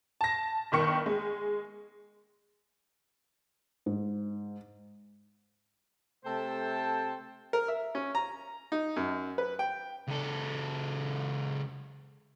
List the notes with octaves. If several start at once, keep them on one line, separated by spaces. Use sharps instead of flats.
A5 A#6
G1 D#3 C#6 C#7
G#3
G#2
C3 A3 A4 C5 G5 A5
A#4
E5
C#4
A#5
D#4
F#2
B4
G5
C#2 A4